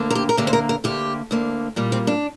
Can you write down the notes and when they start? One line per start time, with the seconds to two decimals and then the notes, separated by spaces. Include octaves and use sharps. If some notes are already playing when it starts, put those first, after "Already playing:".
Already playing: D2 D3 A#3
0.10 A#4
0.15 G4
0.29 A#4
0.37 D2 D3 A#3 G4
0.47 C5
0.53 A#4
0.69 A#4
0.84 D2 D3 A#3 G4
1.31 D2 D3 A#3
1.76 A#2 G3 A#3
1.92 C4
2.07 D4